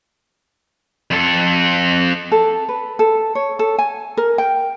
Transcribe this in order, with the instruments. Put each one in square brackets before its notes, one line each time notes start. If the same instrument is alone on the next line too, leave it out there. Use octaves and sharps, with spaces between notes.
[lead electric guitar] F2 A4
[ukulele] A4
B4
A4
C#5
A4
G#5
A#4
G5